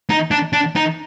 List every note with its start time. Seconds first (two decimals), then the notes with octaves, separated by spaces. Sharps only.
0.10 D#4
0.31 D4
0.53 D4
0.76 D#4